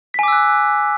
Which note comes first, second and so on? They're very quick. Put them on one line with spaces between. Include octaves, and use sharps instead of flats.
B6 G#5 D6 E6 F#6